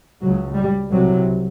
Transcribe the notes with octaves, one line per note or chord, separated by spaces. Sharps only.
C#2 C#3 F#3
G3
C2 C3 F#3